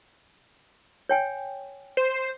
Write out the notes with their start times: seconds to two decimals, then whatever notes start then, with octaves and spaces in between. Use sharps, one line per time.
1.09 C#5 G5 G#5
1.97 C5